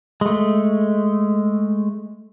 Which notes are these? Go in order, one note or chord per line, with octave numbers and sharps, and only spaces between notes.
G#3 A3